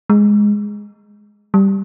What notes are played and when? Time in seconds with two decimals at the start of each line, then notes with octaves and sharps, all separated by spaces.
0.10 G#3
1.54 G3